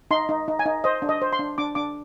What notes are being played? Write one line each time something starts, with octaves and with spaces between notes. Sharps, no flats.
D#4 C6
D#4
D#4
G#5
D#4
C5 D#5
D4
D#5
C5
C6
D4
D4 D6
D4 D6